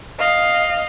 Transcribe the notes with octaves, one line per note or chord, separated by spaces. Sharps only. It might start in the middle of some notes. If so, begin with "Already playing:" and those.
D#5 F5